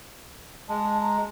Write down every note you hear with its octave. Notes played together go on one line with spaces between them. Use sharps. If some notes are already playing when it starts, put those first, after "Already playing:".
G#3 A5
A#5